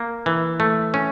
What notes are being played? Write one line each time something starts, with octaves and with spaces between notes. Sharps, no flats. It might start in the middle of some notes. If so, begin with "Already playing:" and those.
Already playing: A#3
E3
A3
C#4